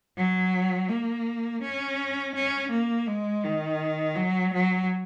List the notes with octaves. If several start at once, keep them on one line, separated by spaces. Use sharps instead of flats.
F#3
A#3
C#4
C#4
A#3
G#3
D#3
F#3
F#3